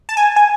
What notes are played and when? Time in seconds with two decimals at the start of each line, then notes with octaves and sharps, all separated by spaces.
0.09 A5
0.17 G#5
0.36 G#5